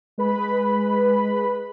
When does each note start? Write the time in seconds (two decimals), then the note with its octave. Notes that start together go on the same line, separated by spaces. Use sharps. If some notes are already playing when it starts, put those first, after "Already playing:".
0.18 G#3 B4 B5